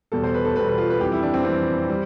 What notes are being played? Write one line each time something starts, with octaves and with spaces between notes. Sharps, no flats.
E2 B2 G3 A4
C5
B4
A4
E2 B2 G3 B4
B4
F4
B4
F2 E3 G3 G4
E4
D4
C4
F2 E3 G3 C4
G3